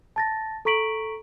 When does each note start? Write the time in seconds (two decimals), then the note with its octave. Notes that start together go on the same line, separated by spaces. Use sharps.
0.16 A5 A6 A#6
0.65 A4 A#5 C#6 B6 D7 F#7